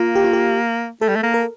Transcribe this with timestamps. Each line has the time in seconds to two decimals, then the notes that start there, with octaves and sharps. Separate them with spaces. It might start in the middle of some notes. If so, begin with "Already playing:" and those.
Already playing: A#3 F4
0.15 G4
0.24 F4
0.33 G4
1.01 A3 A4
1.09 G3
1.15 A3
1.23 A#3
1.34 A#4